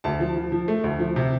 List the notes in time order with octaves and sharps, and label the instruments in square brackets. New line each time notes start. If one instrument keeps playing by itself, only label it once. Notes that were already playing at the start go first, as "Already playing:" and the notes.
[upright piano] D2 A5
F3
F3
F3
A3
D2
F3
C3